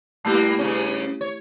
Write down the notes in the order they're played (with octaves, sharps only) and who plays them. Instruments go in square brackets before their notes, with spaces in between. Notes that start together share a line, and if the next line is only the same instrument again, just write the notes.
[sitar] A#2 G3 A#3 [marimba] A3 E4 G4
[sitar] G2 C#3 C#4
C#5